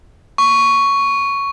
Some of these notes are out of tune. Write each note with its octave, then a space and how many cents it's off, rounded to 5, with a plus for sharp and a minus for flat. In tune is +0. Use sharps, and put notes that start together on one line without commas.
C#6 +5